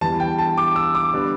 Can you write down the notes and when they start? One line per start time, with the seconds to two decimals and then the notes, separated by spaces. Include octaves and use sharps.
0.01 E2 E3 G3 A5
0.20 G5
0.39 A5
0.58 D6
0.76 E6
0.95 D6
1.13 D3 G3 B3 D4